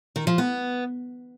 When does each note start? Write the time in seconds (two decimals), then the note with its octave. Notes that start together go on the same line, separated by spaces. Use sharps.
0.16 D#3
0.27 F3
0.38 B3